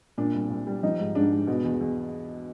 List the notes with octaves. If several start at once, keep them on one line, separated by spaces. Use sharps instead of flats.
A#2 D4
C2
C2
G3
F3 D#4
G#2
G#2 D4
G#3
B2
E2
E2